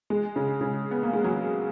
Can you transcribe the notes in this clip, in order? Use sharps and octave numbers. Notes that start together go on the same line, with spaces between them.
G#3
C#3
C#3
B3
A#3
G#3
F#3